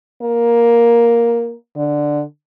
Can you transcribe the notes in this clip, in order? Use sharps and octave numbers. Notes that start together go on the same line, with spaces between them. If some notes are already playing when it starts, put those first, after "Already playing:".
A#3
D3